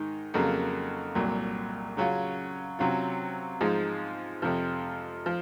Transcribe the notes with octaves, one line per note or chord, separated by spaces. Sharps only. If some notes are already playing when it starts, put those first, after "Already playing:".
Already playing: G#2 D#3 D#4
F2 C#3 F#3 A#3
C2 A#2 F#3
C#3 F#3 C#4 F4
C3 F#3 C#4 F4
G#2 F3 G#3 D#4
F2 C3 F3
F3